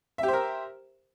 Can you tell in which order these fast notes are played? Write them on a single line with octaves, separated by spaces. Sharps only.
E5 G4 C5 A#4